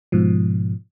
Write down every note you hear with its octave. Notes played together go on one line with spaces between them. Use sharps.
G#2 B2 F3